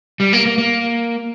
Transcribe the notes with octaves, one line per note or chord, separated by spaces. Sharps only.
G3
A#3
A#3
A#3